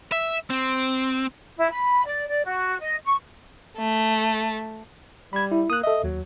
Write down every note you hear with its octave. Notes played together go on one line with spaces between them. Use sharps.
E5
C4
E4
B5
D5
D5
F#4
D#5
C#6
A3
G3 B5 G#6
E4
A#3 D#6 F#6
A4 D#5 E5
D#2 F#3